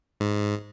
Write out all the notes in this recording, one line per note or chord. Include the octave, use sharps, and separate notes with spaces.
G#2